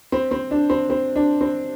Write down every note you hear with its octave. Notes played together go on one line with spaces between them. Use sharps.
C4
C4
D4
C4
C4
D4
C4